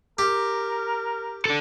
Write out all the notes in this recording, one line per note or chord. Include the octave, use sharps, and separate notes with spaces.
G4 A#4
D4 A4